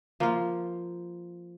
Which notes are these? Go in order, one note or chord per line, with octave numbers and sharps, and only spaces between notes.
F3 A#3 F4